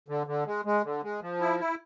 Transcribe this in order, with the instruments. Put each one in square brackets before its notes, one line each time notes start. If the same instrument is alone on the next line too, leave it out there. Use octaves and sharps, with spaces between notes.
[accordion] D3
D3
G#3
G#3
D3
G#3
F3
E4
E4